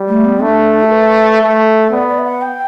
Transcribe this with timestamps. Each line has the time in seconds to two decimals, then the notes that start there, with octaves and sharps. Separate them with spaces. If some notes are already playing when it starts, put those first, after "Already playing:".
Already playing: G3
0.08 A3
0.24 B3
0.41 A3 D4
0.83 A4
0.91 B4
1.41 A3
1.90 B3 D5
2.08 D5
2.18 E5
2.24 F#5
2.41 G5